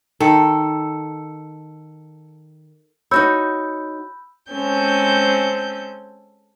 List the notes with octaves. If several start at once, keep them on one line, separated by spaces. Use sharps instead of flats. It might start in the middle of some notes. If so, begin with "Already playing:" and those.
D#3 A4
D#4 F#4 C#5 B5 E6 G6
G#3 C4 C#4 A4 G6